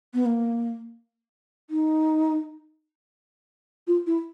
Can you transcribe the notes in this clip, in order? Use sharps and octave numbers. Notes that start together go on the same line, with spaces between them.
B3
A#3
D#4
F4
E4